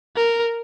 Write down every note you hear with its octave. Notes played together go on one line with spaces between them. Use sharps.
A#4